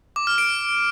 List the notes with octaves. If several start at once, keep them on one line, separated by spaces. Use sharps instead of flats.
D6
F6
D7